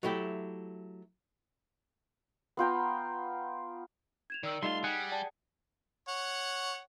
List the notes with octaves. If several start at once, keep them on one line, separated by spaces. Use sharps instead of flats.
F#3 A3 E4 G4
B3 F4 G5 A#5
G#6 E7 F7
D#3 D5 E6 F#7
G3 A3 D#4 F4 D#5 C6 C7
G3 G#4 F#5 G#5
D5 G5 A5
C#5 F#5